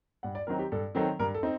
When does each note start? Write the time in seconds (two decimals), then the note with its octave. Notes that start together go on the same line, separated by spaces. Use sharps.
0.23 G2 F#5
0.35 D5
0.47 D#3 F#3 C4 D#4 A#4
0.59 G4
0.72 G2 A4
0.95 D#3 F#3 C4 D#4 A4
1.19 G2 A#4
1.34 A4
1.43 C4 D#4